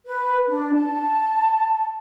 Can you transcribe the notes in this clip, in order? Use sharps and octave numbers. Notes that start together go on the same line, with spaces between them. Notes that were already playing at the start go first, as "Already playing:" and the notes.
B4
D4
A5